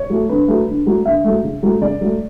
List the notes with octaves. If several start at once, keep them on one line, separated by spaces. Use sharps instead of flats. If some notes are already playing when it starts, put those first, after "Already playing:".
Already playing: C#5
F#3 A3
D3 B4
F#3 A3
D3
F#3 A3
D3 E5
F#3 A3
C#3
F#3 A3
C#3 D5
F#3 A3